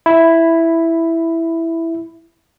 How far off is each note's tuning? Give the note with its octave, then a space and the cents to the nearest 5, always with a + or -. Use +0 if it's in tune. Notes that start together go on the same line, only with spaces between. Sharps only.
E4 +0 B5 +10